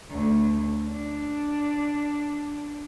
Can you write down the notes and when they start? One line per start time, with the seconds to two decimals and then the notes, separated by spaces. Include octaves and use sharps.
0.10 D2
0.88 D4